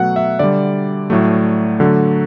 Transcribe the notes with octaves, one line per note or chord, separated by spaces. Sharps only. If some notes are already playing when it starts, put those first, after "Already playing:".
Already playing: B2 F#3 A3 F#5
E5
D3 G3 D5
A2 F#3 A3
D3 F#3 A3